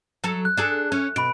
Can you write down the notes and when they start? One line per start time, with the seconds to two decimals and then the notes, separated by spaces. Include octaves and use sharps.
0.24 F#3 A4
0.45 F#6
0.57 D4 G#4 A4
0.92 C#4
1.16 B2 B5 D7